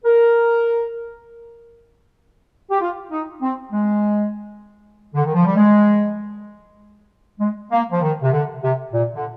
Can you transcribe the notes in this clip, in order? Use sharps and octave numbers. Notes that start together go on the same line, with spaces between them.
A#4
G4
F4
D#4
C4
G#3
D3
D#3
F3
G3
G#3
G#3
A#3
F3
D#3
C3
D3
C3
A#2
D3